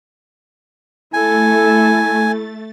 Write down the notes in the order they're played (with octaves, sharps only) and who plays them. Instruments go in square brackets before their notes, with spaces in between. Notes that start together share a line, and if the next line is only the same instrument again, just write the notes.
[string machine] A3 A6 [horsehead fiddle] E4 A4 [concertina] G#5